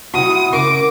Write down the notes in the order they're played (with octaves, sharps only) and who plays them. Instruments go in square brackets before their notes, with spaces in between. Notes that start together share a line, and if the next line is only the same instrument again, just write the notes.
[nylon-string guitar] C3 F#4 [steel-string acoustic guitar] A3 E4 F#5 [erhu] D#6
[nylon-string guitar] C#3 [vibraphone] A#4 [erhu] D6